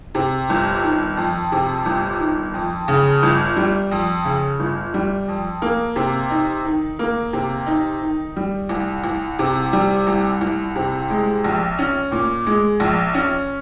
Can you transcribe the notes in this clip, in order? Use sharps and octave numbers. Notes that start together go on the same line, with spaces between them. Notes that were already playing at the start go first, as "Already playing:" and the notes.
C3
G1
D#3
F2
C3
G1
D#3
F2
C#3
G1
G3
F2
C#3
G1
G3
F2
A#3
C3
D#4
D#3
A#3
C3
D#4
D#3
G3
C2
C2
C3
G3
C2
C2
C3
G#3
A#1
C#4
A#2
G#3
A#1
C#4